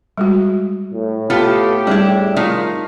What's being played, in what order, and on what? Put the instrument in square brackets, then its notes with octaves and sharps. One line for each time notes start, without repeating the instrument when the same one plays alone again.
[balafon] G3 G#3 F#4
[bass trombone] A2
[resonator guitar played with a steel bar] B3 F4 A4 [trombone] G4
[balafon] G3 G#4 [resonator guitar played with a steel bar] D4 E4
[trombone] D#3 [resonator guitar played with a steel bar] A3 D#4 F4